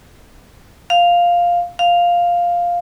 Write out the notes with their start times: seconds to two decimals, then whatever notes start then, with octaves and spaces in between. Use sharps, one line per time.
0.90 F5
1.79 F5